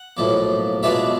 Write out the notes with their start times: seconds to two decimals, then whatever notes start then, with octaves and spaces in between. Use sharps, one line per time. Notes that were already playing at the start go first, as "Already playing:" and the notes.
Already playing: F#5
0.17 B1 A2 F3 A#3
0.83 B2 G#3 B3 D4 F4 E5